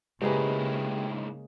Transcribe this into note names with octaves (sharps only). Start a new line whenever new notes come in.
G#2 C#3 G#3 A#3 E4 G4 G#4 B4